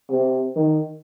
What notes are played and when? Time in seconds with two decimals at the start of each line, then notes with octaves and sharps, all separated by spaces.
0.10 C3
0.56 D#3